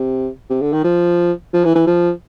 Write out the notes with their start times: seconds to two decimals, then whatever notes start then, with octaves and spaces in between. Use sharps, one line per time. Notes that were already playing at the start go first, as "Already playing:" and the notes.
Already playing: C3
0.50 C3
0.61 D3
0.73 D#3
0.84 F3
1.53 F3
1.64 E3
1.75 E3
1.87 F3